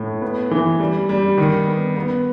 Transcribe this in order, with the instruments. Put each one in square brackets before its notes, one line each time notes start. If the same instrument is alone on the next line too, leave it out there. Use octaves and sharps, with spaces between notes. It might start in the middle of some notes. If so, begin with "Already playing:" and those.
Already playing: [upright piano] A2
B3
E3
G3
G3
D#3
B3
B3